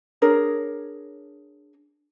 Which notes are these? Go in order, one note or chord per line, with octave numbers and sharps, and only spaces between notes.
D4 G#4 A#4 C#5